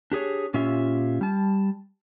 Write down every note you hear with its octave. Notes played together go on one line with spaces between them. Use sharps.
D4 G4 G#4 C#5
A#2 C#4 F4 G4 E5
G3 A5